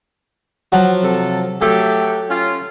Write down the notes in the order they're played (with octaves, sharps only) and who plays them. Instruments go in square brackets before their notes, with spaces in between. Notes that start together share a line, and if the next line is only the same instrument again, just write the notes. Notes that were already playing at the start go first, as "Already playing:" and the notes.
[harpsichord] F3 F#3 F#4
[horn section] C3 A4
[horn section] F#3 A3 G4 [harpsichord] A4
[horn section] C#4 F4